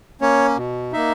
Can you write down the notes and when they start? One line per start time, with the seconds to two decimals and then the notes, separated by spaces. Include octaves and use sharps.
0.21 A#3 C#4 C#5
0.57 B2
0.92 A#3 D#4 E5